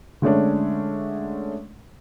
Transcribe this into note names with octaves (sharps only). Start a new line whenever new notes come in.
D3 G#3 A3 C#4 D4